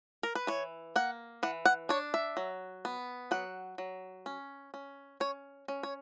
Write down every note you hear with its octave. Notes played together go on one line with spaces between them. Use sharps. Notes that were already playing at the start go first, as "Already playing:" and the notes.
A#4
B4
E3 C#5
A#3 F#5
E3 F#5
F#5
D4 C#5
E5
F#3
B3
F#3 F#5
F#3
C#4
C#4
C#4 C#5
C#4
C#5